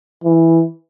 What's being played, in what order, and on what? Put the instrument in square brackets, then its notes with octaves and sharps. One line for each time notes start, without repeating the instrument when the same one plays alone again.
[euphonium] E3